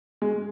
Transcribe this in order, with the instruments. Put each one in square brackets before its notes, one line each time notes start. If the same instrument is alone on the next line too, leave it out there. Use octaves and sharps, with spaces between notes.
[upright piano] G#3